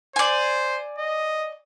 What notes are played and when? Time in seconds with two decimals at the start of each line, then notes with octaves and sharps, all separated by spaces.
0.16 C5 D5 G#5
0.98 D#5